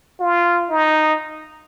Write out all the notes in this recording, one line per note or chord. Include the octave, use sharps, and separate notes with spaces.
F4
D#4